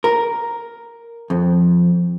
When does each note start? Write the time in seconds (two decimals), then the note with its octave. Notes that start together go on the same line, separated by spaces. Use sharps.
0.04 A#4
1.30 F2